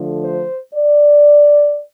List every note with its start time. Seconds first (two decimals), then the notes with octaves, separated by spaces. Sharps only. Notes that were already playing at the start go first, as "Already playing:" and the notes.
Already playing: D3 F3 A3
0.24 C5
0.74 D5